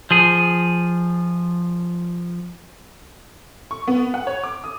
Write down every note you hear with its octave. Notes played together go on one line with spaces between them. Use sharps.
F3 G#4
C#6
B3
F#5
C#5
D6
D#6